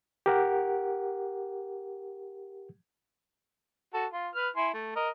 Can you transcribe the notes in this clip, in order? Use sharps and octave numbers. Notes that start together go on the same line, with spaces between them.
G4 A#4 F#5
F#4 A4
F4
B4 F6
E4 G#5 C6
A3
A#4 D#5